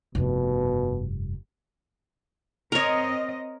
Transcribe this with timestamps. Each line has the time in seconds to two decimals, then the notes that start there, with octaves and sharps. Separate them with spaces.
0.15 F1 G2 B2
2.72 C4 A#4 C#5 D#5